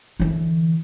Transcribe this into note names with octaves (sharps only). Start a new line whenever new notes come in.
D3 E3